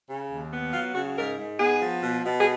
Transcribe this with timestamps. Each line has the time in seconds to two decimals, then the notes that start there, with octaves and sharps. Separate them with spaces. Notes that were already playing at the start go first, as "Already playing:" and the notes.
0.08 C#3
0.30 D#2
0.51 B3
0.73 F#3 F4
0.95 C#3 F#4
1.16 G#2 A#4
1.38 G#2
1.59 B3 G#4
1.81 F3
2.03 B2
2.25 B2
2.39 G#4